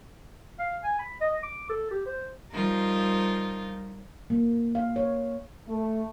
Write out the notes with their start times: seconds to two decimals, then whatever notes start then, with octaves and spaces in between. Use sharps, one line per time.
0.59 F5
0.84 G#5
0.99 B5
1.21 D#5
1.43 D6
1.70 A4
1.91 G4
2.06 C5
2.51 F3 G3 D#4 F4 A#4
4.30 A#3
4.75 F5
4.96 C#5
5.67 A3